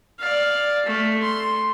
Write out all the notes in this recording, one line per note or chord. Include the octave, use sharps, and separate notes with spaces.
D5 F5
A3
C6